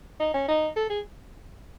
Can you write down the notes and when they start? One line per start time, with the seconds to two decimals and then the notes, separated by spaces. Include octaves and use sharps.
0.20 D#4
0.34 C#4
0.48 D#4
0.76 A4
0.90 G#4